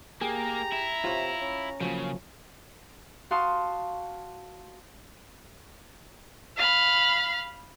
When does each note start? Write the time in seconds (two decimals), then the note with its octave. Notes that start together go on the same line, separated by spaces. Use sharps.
0.21 A#3 G4 G#4 A#5
0.72 E4
1.04 C3 F4 C#5
1.42 C#4
1.81 C#3 F3 F#3 A#3
3.31 F#4 F5 A5 C6 D#6
6.57 F5 B5